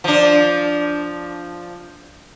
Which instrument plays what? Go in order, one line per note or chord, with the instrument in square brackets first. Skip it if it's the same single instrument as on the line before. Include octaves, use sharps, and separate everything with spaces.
[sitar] F3 D4